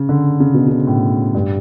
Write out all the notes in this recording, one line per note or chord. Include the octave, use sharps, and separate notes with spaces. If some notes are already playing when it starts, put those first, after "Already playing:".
Already playing: C#3
D3
C#3
B2
C#3
A2
G2